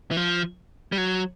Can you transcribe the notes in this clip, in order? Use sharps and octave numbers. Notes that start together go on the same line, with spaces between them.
E3
F3
G3
F#3